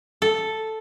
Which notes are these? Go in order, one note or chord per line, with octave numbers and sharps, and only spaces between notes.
A4